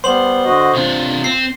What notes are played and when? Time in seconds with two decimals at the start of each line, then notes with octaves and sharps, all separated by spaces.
0.04 G3 B3 C5 C6 F#7
0.45 D3 F#4 D#5
0.75 C3 D4 F4
1.24 C4 C7